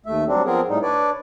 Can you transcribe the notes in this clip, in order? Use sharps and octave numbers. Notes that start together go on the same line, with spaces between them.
D#2 A3 E5
F#3 G3 C4 D4
F3 B3 C4 G#4 A#4
A2 G3 D#4
D4 B4 C#5 D5